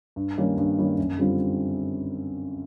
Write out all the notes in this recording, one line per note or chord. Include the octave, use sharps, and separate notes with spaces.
G2
D#3 G3 A#3 C#4
G2
D#3 G3 A#3 C#4
F#2
D3 G3 C4 F4